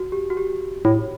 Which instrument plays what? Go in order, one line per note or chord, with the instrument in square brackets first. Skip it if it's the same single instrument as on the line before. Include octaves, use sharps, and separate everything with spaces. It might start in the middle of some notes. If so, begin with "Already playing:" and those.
Already playing: [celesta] F#4
G4
F#4
G4
[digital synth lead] A2